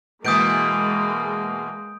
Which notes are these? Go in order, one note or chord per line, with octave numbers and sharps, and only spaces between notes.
B2 E3 G#3 A#3 D#6 G6 D7